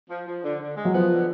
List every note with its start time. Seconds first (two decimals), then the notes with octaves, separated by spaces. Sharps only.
0.10 F3
0.27 F3
0.44 D3
0.61 D3
0.77 G#3
0.85 F#3
0.94 F3 B3
1.11 D3